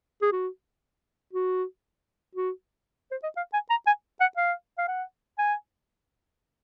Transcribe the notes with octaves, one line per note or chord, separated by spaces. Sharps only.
G#4
F#4
F#4
F#4
C5
D#5
F5
G#5
A#5
G#5
F#5
F5
F5
F#5
G#5